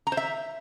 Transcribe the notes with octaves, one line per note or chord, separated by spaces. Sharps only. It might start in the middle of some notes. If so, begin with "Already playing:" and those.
A#5
C5
E5